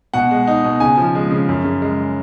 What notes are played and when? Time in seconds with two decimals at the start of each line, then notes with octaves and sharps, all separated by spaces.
0.14 B2 F#5
0.31 G#3
0.47 D#4
0.64 B2
0.80 C#3 G#5
0.97 F3
1.15 G#3
1.31 C#3
1.49 F#2
1.64 C#3
1.82 G#3